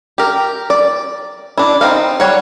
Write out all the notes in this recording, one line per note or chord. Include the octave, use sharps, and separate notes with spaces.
G4 A#4
D5
D4 E4
C4 D#4 F5
G3 C#5 F#5